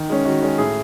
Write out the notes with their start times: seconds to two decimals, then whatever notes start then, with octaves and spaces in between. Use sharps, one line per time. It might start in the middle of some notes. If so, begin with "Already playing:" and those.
Already playing: D#3
0.10 G#3 C#4
0.25 D#3 F#4
0.42 G#3 C#4
0.58 A2 G#4